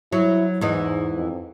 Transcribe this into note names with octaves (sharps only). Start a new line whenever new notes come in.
F#3 E4
E2 G#2 E3 D#4
F2